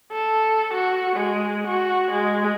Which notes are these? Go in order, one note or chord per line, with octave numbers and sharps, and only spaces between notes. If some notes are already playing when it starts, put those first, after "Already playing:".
A4
F#4
G#3
F#4
G#3